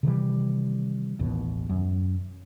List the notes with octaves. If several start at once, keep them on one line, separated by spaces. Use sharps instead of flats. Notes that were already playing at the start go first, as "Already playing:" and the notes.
C3 D#3 E3 G3
A1 D#2 B2
F#2